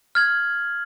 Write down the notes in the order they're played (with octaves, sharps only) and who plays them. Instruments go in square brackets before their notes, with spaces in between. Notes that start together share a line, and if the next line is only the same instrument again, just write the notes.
[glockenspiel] F6 G#6 F#7